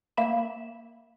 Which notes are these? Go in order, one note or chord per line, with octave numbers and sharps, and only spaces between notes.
A#3 E5 B5 E7